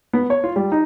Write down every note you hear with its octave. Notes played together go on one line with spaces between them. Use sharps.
B3
C#5
F4
G3
D#4